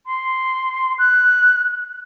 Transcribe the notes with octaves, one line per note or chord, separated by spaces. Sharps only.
C6
F#6